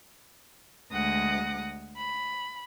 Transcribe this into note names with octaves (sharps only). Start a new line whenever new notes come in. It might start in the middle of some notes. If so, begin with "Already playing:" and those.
D2 G#3 F#5 D#6 A#6
B5